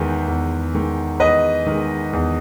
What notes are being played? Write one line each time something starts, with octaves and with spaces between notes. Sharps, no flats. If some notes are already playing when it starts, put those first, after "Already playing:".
Already playing: E2 D#3 G#3 B4
E2
D#3 G#3
E2 B4 D#5
D#3 G#3
E2